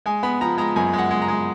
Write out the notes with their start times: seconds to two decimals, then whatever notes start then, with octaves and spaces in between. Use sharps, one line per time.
0.06 G#3 G#5
0.23 B3 B5
0.41 F3 A#5
0.58 G#3 A#5
0.76 F#2 G#5
0.93 G#3
0.98 F#5
1.11 G#3
1.22 A#5
1.28 G#3